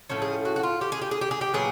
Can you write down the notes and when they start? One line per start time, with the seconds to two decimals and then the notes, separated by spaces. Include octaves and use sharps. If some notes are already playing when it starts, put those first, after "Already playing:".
0.10 A2 F3 A3 C#4 A4
0.22 G#4
0.45 F#4
0.56 F#4
0.63 F4
0.81 G4
0.92 G#4
1.02 G4
1.11 G#4
1.21 G4
1.31 G#4
1.41 G4
1.54 A#2 F#3 B3 D4 G#4